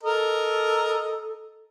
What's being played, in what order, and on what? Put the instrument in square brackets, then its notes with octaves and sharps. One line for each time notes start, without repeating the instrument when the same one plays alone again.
[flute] A4 [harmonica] A#4 D#5